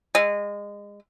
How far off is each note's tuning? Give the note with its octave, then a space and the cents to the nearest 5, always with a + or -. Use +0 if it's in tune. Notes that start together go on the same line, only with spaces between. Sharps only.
G#3 -25